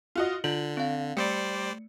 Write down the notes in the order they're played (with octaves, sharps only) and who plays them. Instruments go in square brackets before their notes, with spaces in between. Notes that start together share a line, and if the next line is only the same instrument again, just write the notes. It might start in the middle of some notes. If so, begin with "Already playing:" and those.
[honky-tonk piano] F4 F#4 D#5
[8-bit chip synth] D3 [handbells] F4 [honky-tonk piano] F#7
[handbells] C4 F5
[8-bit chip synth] G3 C5 D5 [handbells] A3 [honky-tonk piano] C#7